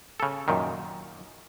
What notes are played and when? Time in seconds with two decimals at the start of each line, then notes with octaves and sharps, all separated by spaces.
0.20 C#3 A4
0.48 F#2 A#2 D#3